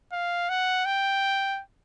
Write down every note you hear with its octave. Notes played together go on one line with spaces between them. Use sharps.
F5
F#5
G5